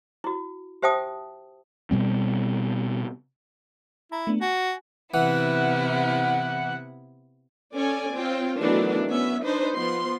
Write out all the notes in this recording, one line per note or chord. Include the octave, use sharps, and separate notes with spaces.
E4 F#4
G4 C5 E5 G5 A5 D#6
B2 G3 C4
E4 A#5
A3 B3 D4
F#4 G#5
C3 E3 B3 E4 F#5
C#4 A4 C#5 D5 G#5
C4 F4 C#5 G5
D#3 E3 F#3 A3 B3 D4
B3 C#4 E5
D4 D#4 B4 C5
F3 B3 C6